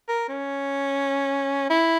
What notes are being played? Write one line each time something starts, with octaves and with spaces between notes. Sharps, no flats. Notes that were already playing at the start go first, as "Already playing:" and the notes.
A#4
C#4
E4